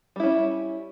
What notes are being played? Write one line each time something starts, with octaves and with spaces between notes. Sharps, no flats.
G3 C#4 E4